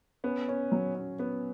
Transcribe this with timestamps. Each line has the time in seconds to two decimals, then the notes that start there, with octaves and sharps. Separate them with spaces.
0.24 B3 C#4
0.48 C#4
0.72 F#3
0.95 C#4
1.19 B3 C#4